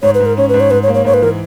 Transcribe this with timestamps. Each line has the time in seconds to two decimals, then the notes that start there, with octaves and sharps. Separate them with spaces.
0.02 G#2 C#5
0.14 B4
0.20 G#2
0.26 A#4
0.37 C#4 C#5
0.49 B4
0.54 G#2
0.60 C#5
0.71 G#2 B4
0.83 C#5
0.88 A#3
0.94 C#5
1.05 G#2 C#5
1.14 B4
1.22 E3 A#4